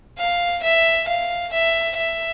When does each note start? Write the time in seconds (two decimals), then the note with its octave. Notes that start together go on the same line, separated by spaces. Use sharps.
0.18 F5
0.63 E5
1.08 F5
1.53 E5
1.97 E5